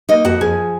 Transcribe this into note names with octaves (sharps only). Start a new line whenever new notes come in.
A#3 D#4 D#5
F2 F#4 F#5
F3 G#4 G#5